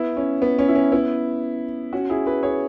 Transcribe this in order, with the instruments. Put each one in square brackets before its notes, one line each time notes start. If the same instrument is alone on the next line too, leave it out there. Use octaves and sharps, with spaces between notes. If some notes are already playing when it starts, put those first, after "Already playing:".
Already playing: [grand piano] B3 E4
C#4
B3
C#4
E4
C#4
B3 E4
C#4 F#4
E4 G#4
F#4 B4
G#4 C#5